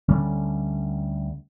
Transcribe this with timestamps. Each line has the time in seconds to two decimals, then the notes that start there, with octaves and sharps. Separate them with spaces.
0.08 D2 D3 G3 C#4